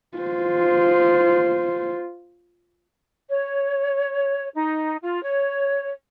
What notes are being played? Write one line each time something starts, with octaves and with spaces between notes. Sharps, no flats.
F4 C5
C#5
D#4
F4
C#5